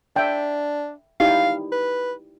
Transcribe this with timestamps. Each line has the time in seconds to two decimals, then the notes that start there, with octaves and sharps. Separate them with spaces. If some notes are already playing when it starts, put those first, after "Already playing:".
0.16 D4 E5 G5
1.20 D#4 E4 G4 F5
1.72 B4